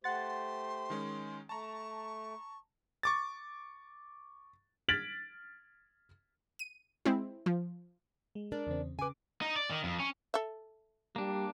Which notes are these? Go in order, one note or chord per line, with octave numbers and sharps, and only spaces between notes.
A3 G4 C5 F#5 C6 A6
D#3 G#3 C#4
A3 A5 A#5 C#6
C#6 D6 A6
F6 G#6 A6 B6 D7 F#7
D#7
G#3 C4 E4
F3
G#3
D4 A#4 D5
E2 C#3 C4
C#3 B4 G#5 D6
D#4
D5
D#3
F2
C#4
A4 E5
G3 A#3 D4